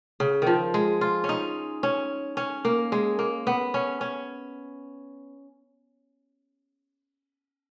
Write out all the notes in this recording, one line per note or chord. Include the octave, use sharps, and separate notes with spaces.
C#3
D#3 F3
G#3
F4
C#4
D#4
C#4
C#4
A#3
G#3
A#3
B3
C#4
C#4